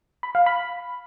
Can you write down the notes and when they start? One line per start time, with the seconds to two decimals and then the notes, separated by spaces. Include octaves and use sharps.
0.23 B5
0.35 F5
0.46 B5